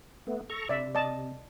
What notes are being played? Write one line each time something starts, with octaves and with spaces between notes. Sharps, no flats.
A3 B3
A4 A#5 C#6
C3 D5 E5
D5 D#5 A5